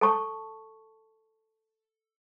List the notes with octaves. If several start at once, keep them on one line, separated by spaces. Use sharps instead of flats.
A4 A5 C#6